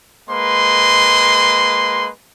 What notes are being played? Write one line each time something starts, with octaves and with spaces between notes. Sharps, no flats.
G#3 A#3 B4 C6